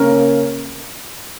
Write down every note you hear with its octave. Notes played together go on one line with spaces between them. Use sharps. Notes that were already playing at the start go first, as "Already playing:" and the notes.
Already playing: C#3 A#3 C#4 A#4